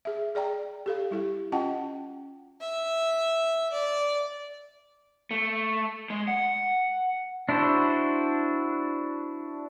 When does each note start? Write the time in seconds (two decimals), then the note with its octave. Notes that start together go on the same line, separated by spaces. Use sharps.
0.05 G#4 E5
0.35 G#4 D5 G5 A#5
0.86 G4 A4 F5
1.11 G3 E4 G4
1.52 C#4 F4 D#5 F#5 G5 A5
2.61 E5
3.73 D5
5.31 A3
6.10 G#3
6.27 F#5
7.49 D4 E4 F#4 C5